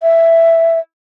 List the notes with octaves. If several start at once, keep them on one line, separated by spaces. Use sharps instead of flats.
E5